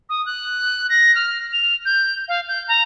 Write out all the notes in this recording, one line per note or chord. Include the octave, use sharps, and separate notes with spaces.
D#6
F#6
A#6
F6
F7
G6
F5
G6
A#5